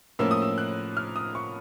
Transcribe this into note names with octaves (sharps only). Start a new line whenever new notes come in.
A2 F3 A#3 C#4 E6
D#6
E6
F#6
F6
D#6
C#6